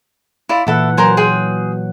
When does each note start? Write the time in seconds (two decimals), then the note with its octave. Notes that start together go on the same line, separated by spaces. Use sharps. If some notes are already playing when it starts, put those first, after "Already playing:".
0.49 E4 F4 D5
0.67 A#2 E3 E4 A4 E5 F#5
0.97 F#3 A#4 C5 G#5
1.17 G#4 G5 C6